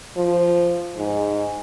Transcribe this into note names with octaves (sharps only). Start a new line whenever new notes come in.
F3
G#2